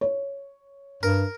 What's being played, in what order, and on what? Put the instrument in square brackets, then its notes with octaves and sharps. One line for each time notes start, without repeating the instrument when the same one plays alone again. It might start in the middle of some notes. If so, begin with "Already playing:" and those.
[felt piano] C#5
[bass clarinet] G2 [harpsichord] A#4